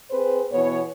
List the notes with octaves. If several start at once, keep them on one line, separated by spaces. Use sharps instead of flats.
C4 G#4 B4 C5
B2 E3 B3 C#5